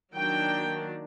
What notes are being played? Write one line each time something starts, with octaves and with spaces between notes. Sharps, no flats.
D#3 F#3 A#3 D4 G5